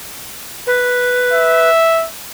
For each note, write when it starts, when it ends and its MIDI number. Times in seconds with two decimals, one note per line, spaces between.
0.67 1.69 71
1.33 2.07 76